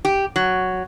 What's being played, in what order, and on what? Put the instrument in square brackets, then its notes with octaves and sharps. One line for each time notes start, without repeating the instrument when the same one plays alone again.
[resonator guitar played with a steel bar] G4
F#3